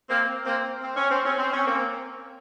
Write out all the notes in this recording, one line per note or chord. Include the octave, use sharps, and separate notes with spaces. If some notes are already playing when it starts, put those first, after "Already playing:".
A#3 C4
A#3 C4
C4
C#4
C4
C#4
C4
C#4
A#3 C4